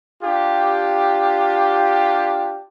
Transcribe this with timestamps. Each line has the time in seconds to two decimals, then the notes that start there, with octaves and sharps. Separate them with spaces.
0.23 D4 F4 G4